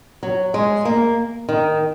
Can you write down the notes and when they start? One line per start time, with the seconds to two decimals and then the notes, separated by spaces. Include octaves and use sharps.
0.23 F#3
0.54 G#3
0.85 A#3
1.49 D#3